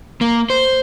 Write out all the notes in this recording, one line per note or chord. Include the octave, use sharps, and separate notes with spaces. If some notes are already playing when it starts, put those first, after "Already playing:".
A#3
C5